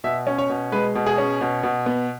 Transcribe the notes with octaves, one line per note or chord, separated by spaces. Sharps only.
B2 E5
C#4
C#5
B2
G#3 B4
B2
G#4
C#4
B2
B2
B3